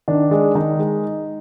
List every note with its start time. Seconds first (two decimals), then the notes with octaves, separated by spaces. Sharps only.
0.08 D#3 D4
0.31 G#3
0.55 D#3 D#4
0.79 G#3